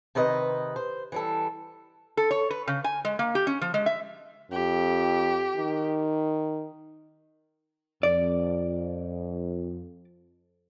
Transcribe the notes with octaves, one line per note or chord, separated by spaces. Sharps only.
C3 D#3 B4 D#5
C5
E3 G3 A4
A4
C#5
B4
C#3
G#5
G#3
A#3
G4
C#4
F3
G#3
E5
F2 G4
D#3
F2 D5